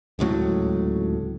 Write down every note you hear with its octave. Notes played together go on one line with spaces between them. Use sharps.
D1 C#2 A2 F#3